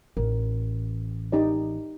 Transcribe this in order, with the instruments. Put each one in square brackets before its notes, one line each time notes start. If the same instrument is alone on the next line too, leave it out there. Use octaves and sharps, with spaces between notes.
[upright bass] A1 [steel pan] A#4
[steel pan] D#4 G4 D5